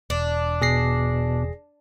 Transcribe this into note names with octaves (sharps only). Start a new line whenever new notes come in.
E1 D4
B2 G#4 A#6 C7